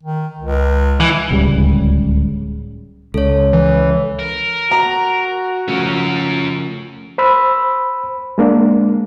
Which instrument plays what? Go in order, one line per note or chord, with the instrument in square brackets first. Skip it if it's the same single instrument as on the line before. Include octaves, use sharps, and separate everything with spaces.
[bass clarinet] D#3
C#2
[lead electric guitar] E3
[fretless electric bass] D1 C#2 C#3 G3
[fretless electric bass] C#2 [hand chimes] A4 C#5
[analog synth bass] E3
[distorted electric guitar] A#4
[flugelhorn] F#4 [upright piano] A#5
[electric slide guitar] C#3 F3 A3 [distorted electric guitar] C#4 A#4
[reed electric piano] C5 B5 E6
G#3 A#3 D4